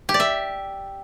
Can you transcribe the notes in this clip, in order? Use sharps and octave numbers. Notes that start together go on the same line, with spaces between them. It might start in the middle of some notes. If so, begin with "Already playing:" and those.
G4
D5
E5